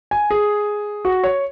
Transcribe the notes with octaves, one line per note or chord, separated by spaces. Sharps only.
G#5
G#4
F#4
C#5